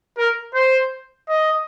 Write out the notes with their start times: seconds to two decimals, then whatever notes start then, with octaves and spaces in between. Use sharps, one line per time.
0.18 A#4
0.54 C5
1.29 D#5